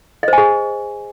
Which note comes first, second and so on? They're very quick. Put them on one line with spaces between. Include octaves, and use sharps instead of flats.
D#5 C5 G#5 G#4